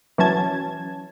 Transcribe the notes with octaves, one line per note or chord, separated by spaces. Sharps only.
E3 F#3 C#4 A5 G#6